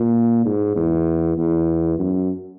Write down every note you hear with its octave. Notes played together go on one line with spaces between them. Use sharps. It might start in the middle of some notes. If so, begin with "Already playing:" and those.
Already playing: A#2
G#2
E2
E2
F#2